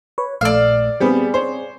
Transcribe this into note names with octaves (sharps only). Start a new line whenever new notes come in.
B4 C#5
A#1 A3 D5 F5 E6
G3 B3 C4 G#4
C5 C#5